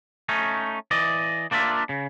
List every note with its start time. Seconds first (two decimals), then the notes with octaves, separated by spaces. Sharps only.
0.29 A3 C#4 D#4
0.91 E3 D5 D#5
1.51 A#3 D4 F4 D5 E5
1.89 C#3